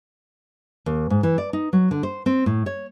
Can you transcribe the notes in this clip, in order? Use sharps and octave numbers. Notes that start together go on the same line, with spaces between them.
D#2
G#2
E3
D5
D#4
F#3
D3
C5
C4
A2
C#5